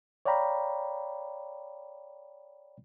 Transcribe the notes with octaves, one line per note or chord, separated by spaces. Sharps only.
C#5 D5 F5 G5 A#5 B5